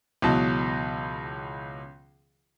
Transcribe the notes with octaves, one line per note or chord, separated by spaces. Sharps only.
C#2 B2 E3 F#3 A5